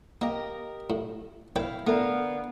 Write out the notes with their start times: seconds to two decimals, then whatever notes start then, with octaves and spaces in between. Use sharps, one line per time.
0.21 A#3 G4 A#4 D#5
0.90 A2
1.56 E4 B4 C#5 F5 G5
1.87 D3 A3 B3 A#4 F5